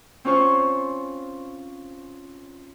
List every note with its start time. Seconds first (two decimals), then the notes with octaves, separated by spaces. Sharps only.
0.25 C4 C#4 F4 C5 C#6